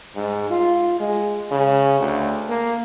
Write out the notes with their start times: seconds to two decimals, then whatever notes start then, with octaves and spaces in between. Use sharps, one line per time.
0.15 G#2
0.50 F4
1.00 G#3
1.51 C#3
2.00 D2
2.49 A#3